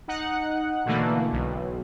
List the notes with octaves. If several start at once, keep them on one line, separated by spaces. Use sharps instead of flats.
D#4 F#5
B2 D3 E3 A3 A#3
B1